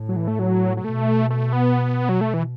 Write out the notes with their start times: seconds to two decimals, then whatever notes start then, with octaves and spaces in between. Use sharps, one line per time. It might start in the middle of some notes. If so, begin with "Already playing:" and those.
Already playing: A2
0.09 F#3
0.16 E3
0.28 A3
0.39 F#3
0.77 F#3
0.84 B2 A3
1.30 A3
1.53 B3
2.09 F#3
2.21 A3
2.34 E3